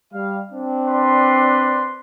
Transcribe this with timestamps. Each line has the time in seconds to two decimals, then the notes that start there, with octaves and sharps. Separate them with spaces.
0.13 G3 F5
0.51 C4 D4
0.88 B4 D5 C6